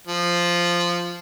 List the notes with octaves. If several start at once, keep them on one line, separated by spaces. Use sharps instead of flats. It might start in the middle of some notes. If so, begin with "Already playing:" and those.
F3